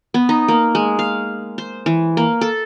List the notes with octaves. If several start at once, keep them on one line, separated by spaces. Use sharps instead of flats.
B3
D#4
A#3
G#3
F5
C5
E3
A#3
A4